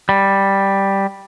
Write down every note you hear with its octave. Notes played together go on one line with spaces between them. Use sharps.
G3